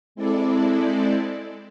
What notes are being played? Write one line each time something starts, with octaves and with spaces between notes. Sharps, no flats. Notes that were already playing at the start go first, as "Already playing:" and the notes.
G#3 C4 E4 A4 D5